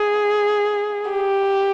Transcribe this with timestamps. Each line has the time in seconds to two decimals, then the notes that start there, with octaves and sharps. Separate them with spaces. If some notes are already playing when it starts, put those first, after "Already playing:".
Already playing: G#4
1.11 G4